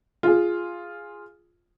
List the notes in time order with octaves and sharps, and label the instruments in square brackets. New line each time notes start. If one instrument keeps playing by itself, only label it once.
[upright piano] F4 G#4